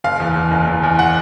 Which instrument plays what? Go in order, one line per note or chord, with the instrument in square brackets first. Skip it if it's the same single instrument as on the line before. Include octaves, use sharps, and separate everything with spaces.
[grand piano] F#1 F5
E2
E2
F#1
E2
E2
F#5